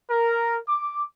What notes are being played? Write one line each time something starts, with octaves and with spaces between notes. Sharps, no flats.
A#4
D6